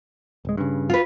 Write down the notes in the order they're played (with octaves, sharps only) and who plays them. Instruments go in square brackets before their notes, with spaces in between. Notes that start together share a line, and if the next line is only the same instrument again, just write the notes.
[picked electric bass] D1 G#3
G2 C#3
[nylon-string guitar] F4 B4